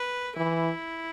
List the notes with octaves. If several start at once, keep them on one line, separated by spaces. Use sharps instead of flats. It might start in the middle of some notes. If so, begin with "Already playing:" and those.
Already playing: B4
E3 E4